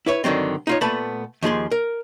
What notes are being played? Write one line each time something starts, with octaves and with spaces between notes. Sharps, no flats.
E4 B4 C#5
G2 D3 D#3 F#3 C4
D#4 F4 C#5
A#2 A3 B3 B4 A5 B5
D#2 F3 G#4 C6
A#4